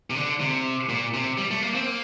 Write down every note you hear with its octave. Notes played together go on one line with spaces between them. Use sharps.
C3
D3
C3
A#2
C3
G3
A3
A#3
C4
A#3